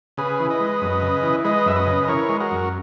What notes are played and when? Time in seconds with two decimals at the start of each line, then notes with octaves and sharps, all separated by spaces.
0.17 C#3 G#4 B4
0.40 E3
0.50 B4 D#5
0.60 G#3
0.82 F#2
1.02 C#3
1.23 E3
1.44 G#3 B4 D#5
1.66 F#2 E5
1.76 B4 D#5
1.87 C#3
2.04 D#5
2.08 E3 A#4 C#5
2.29 G#3
2.40 F#4 A#4
2.51 F#2